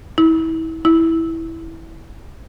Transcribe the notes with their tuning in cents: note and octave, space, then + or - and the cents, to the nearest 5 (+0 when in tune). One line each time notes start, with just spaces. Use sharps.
E4 -30
E4 -10